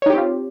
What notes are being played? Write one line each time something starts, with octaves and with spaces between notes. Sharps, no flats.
C4 D#4 F4 G4 C#5